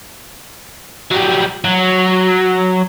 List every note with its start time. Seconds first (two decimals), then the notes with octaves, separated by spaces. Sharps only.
1.12 F#3 G3
1.65 F#3